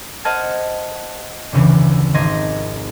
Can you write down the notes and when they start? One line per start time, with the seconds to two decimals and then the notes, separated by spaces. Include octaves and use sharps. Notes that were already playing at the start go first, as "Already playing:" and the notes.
0.25 C5 D#5 F#5 A5 F6 G#6
1.52 F1 D2 C#3 E3
2.14 G#1 D#4 D#5 C6 G#6 A#6